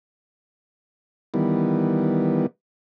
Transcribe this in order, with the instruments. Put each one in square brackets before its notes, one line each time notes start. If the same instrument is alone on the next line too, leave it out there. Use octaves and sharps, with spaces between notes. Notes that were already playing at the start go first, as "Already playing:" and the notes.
[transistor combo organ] D#3 E3 G3 B3